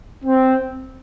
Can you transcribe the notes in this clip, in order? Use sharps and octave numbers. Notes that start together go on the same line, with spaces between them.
C4